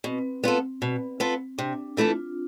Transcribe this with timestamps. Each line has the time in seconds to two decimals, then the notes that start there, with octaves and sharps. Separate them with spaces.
0.04 B2 C4
0.44 B3 F4 A4
0.82 B2
1.20 B3 F4 A4
1.58 C3 D4
1.97 E3 A3 E4 F4 A4